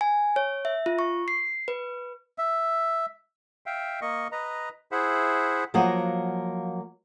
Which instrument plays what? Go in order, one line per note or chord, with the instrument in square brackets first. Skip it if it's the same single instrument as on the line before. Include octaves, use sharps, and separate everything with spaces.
[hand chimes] G#5
C#5
E5
F4
C#6
C7
B4
[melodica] E5
[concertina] E5 F5 G5
A#3 D#5 C#6
B4 D#5 A#5
E4 G#4 C5 E5 F#5
[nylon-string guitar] F3 F#3 A#3 D#5 F#5